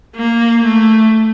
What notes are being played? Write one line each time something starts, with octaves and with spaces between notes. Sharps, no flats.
A#3
A3